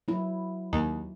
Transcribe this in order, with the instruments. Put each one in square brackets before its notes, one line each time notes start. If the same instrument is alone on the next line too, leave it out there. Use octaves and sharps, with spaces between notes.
[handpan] F#3 E4
[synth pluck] D#2